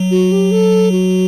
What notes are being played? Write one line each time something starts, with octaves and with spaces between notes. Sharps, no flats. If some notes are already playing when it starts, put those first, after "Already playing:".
Already playing: F#3
F#4
G4
A4
F#4